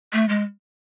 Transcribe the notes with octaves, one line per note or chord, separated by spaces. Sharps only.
A3
G#3